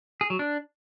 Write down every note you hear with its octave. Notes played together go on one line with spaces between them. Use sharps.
G#4
F#3
D4